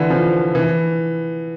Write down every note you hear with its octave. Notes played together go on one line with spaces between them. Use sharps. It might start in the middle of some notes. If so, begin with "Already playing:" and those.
Already playing: D3 E3
F3
E3